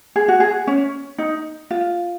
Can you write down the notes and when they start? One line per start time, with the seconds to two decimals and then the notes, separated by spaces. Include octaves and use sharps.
0.16 G#4
0.28 F#4
0.40 G#4
0.67 C#4
1.18 D#4
1.71 F4